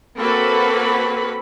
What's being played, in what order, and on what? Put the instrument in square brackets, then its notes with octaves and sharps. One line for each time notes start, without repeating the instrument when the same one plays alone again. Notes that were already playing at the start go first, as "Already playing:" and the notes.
[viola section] A#3 C4 F#4 A4 B4 B5